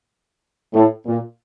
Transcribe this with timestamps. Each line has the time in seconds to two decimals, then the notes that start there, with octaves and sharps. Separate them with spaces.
0.74 A2
1.06 A#2